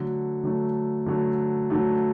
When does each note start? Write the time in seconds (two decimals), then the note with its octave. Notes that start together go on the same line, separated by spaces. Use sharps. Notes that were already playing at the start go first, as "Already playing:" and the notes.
Already playing: D3 F#3 A3
0.43 D3 F#3 A3
1.06 D3 F#3 A3
1.70 D3 F#3 A3